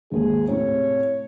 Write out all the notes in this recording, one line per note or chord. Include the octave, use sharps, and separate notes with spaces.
G#1 D#2 G#4
A2 C3 C#5